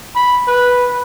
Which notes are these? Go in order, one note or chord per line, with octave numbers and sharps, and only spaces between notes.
B5
B4